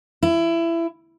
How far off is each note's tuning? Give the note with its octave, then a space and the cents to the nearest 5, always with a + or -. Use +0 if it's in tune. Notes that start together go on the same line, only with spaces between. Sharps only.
E4 +20